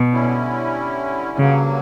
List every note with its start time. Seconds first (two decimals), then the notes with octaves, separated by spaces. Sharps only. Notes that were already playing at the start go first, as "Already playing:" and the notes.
Already playing: B2
0.11 D3 G3 C#4 E4
1.38 G2 C#3 F#3 A#3